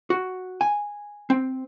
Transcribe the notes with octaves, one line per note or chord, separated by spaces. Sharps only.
F#4
G#5
C4